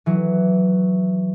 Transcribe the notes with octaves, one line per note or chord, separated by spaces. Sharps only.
E3 F#3